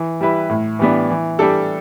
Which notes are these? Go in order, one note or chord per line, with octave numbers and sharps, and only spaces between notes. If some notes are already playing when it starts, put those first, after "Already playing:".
Already playing: E3
G3 E4 B4
A2
E3 G3 B3 D4
E3
G3 D4 A4